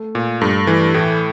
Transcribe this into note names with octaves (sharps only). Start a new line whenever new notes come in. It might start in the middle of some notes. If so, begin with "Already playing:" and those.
Already playing: A3
A#2
G2 A3
E3 A3
A2 A3